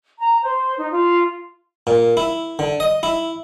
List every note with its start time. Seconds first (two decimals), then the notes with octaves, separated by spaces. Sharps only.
0.19 A#5
0.42 C5
0.77 D#4
0.91 F4
1.87 A#2
2.17 E4
2.59 D3
2.80 D#5
3.03 E4